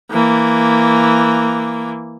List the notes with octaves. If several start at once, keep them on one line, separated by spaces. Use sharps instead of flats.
E3 A#3